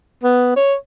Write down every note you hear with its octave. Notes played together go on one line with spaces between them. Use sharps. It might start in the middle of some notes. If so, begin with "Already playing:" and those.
B3
C#5